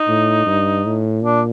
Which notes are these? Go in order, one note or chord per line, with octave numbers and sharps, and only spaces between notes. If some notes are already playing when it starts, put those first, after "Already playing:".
Already playing: D#4
A2
G2
A2
A#2 D4